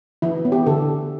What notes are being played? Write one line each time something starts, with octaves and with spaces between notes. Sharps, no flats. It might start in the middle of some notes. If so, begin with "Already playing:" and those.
E3 E4
B3
G4
D3 A4